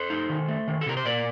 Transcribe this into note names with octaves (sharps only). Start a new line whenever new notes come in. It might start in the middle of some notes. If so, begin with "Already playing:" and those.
Already playing: A4 C5
D#4
D#3
A3
D#3
A4
C3 A#4
C5
A#2 A#4 D5